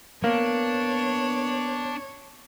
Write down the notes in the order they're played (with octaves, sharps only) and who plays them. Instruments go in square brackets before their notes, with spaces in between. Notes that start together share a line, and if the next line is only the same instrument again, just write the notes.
[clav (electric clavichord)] A#3 [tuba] B3 [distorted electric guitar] D4 [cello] C#5